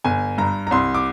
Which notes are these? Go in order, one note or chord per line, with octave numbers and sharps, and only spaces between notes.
G1 G#5
G2 A#5
A#5
C2 C6
D6